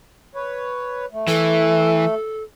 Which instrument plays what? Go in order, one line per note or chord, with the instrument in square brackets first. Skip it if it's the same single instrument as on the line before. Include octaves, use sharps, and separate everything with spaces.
[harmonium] B4 C#5
A3
[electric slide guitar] E3 [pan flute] A4